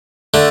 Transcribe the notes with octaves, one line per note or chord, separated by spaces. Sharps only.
D3 A3